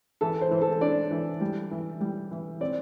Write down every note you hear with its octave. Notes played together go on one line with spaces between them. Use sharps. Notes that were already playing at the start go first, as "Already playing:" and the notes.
E3 A4
C5
E3
A4
D4 D5
E3
G3
E3
G3
E3
C4 D5